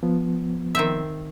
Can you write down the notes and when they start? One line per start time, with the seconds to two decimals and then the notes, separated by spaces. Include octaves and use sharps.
0.03 F3 B3
0.75 D#3 C4 E5